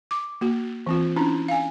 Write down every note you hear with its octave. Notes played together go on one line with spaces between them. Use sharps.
D6
A#3 F#4
E3 C4 F4
C#4 D4 E4
F5 G#5